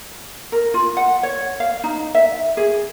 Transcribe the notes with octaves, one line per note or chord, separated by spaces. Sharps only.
A#4
F4
F#5
C#5
F5
D#4
E5
G#4